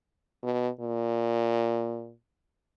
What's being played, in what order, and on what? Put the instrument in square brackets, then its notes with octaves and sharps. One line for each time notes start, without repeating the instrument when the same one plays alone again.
[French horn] B2
A#2